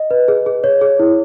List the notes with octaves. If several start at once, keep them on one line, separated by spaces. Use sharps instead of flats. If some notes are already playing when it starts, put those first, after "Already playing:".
Already playing: D#5
B4
G#4
G#4
C#5
G#4
E4